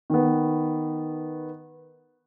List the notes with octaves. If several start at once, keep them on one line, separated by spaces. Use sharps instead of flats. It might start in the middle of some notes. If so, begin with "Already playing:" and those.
D#3 B3